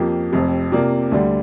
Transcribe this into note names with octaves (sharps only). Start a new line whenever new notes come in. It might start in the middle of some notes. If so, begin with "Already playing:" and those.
Already playing: F2 F3 A#3 G4
F1 F2 C3
C3 A#3 F4 D5
D2 D3 G3